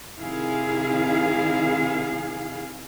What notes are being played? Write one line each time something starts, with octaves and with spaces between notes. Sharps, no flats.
C3 D#3 E4 G#4 F5